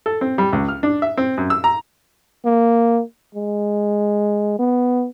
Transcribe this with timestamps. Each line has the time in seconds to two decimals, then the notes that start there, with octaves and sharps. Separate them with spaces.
0.06 A4
0.21 C4
0.38 G3
0.53 C#2
0.68 F6
0.83 D4
1.02 E5
1.17 C4
1.38 F#2
1.50 E6
1.64 A#5
2.45 A#3
3.35 G#3
4.59 B3